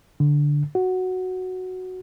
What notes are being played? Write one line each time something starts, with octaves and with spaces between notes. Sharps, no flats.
D3
F#4